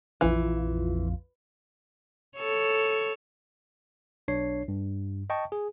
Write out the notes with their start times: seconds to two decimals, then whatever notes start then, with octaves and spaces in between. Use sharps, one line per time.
0.21 A#1 F2 E3 F4
2.37 A4 C#5
4.28 B1 D4 C#5 C7
4.68 G2
5.30 D#5 G5 A5 C#6
5.52 G#4